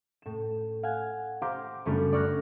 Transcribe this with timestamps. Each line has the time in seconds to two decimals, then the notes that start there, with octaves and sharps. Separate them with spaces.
0.22 A2 E7
0.83 F5 F#5 G#5
1.42 G4 C5 F5 G5 A#5 D6
1.85 F#2 C#3 G3 A3 C#4 D4
2.13 D5 C#6 F6 F#6 A#6